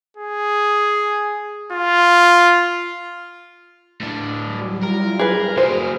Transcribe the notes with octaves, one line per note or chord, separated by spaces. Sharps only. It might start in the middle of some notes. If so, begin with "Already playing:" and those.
G#4
F4
A2 D4
F#3 G3
G3 E4 F4 A#4
G#4 B4 F6
F#3 G#4 C5